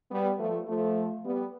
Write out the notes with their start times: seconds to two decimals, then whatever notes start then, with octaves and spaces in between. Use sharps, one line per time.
0.09 G3 B3
0.38 F3 A3
0.67 F3 A3
1.24 G3 B3